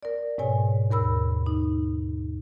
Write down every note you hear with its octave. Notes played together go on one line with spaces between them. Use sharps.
A#4 D5
G#2 B2 C#5 G#5
D#2 A#4 B5 E6
D#4